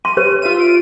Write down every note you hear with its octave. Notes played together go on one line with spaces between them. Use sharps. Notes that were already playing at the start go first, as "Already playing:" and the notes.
C6 D#7
G4 B4 C#5
F4 E5 D#7
D7